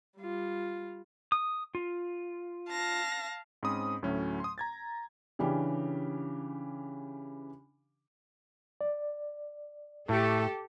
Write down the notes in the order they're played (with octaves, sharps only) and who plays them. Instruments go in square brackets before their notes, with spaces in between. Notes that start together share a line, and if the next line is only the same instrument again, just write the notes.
[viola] G3 F4
[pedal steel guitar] D#6
F4
[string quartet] F5 A5 A#6
[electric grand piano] G#2 C4 C#4 B5 D#6
D2 A2 F#3 A3 C#4
C6 D#6
A#5 G#6 A6
[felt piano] C#3 E3 C#4 D4 G4
[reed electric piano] D5
[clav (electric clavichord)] A2 [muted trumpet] A3 [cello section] G4 A4